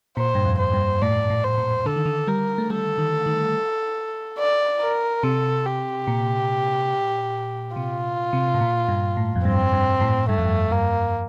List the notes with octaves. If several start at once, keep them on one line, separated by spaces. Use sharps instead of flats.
A#2 C5
G2
F2
C5
G2
A2 D5
A2
C5
A#2
D3 A4
D#3
D3
G3 A#4
A3
G3 A4
D#3
D#3
D5
A#4
C3 A4
G4
A#2
C3 F4
C3
A2
A#2
G2
A2
F2
G2 C4
G2
A2
G2 A3
F2
G2
G2 A#3